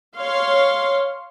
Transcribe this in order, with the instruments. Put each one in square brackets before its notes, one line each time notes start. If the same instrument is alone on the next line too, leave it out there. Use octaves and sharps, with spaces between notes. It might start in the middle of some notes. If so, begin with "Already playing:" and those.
[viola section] C#5 F5 C6